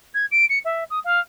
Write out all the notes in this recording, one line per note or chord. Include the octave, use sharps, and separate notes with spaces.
G#6
D7
C#7
E5
D#6
F5